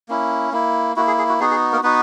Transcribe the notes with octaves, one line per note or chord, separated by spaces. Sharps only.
A#3 C#4 E4
A#3 E4
A#3 E4 F#4
G#4
G#4
F#4
B3 D#4 F#4 G#4
G#4
A#3 A#4
B3 D#4 F#4 B4